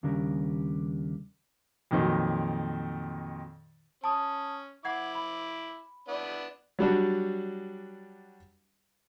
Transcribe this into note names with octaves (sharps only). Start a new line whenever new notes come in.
D#2 C#3 G3 D4 A#4
F2 A#2 D#3 F#3
C#4 A5 D#6
E4 F#5 D6 G#6
B5
B3 D4 E4
F#3 G3 D4 F#4